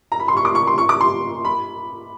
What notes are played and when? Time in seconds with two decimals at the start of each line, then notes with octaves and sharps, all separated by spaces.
0.12 A#5
0.20 B5
0.28 C6
0.37 C#6
0.45 D6
0.55 C#6
0.67 C6
0.78 C#6
0.89 D6
1.01 C6
1.45 B5